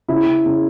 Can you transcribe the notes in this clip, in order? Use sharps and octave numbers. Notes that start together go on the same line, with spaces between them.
C#3 E4
C#3
C#3